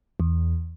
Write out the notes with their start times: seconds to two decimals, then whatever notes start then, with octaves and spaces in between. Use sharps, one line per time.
0.20 E2